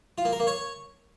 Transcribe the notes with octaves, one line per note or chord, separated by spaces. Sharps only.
F4
A#3
A#4
A#3
C#5